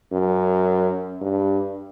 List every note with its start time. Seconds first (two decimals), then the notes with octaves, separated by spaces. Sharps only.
0.12 F#2
1.21 G2